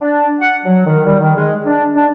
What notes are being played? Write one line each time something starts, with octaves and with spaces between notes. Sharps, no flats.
D4
F#5
F#3
D#3
G3
D#3
G#3
D4
D4